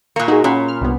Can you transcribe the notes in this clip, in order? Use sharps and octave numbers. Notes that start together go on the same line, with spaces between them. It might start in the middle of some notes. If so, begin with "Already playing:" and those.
A#2 A#3 C#6
D#4 F#4 G#4
A#2 C#4 B5
F6
C2 G2 B3